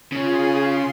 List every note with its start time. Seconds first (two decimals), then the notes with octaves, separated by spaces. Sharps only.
0.12 C#3 C#4 F4 G#4
0.59 C6